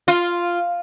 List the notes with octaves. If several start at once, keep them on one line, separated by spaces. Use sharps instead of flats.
F4